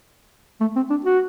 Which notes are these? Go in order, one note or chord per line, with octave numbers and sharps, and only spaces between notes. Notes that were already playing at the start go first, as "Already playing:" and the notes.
A3
C4
D4
F#4